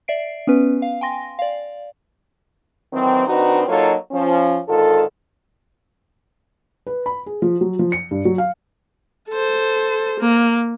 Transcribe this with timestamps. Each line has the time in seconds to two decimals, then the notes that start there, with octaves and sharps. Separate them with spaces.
0.08 D5 E5 C7 D7
0.47 B3 C#4 B4
0.82 F5
1.01 G5 G#5 C6 A#6
1.39 D5 F5
2.92 D#3 E3 F#3 C4
3.26 D#3 C4 D4 D#4 F#4 B4
3.67 F#3 A#3 D#4 F4 A4 C#5
4.11 F3 C#4
4.67 G#2 D3 D#3 F4 A4
6.87 B4
7.06 B5
7.26 G#4
7.42 F3
7.61 F#3
7.79 F3
7.92 C#7
8.11 G2
8.25 F#3
8.38 F5
9.29 A4 C5
10.20 A#3